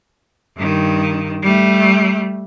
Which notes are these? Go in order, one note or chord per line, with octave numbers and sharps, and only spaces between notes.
G2 D#3
G3 A3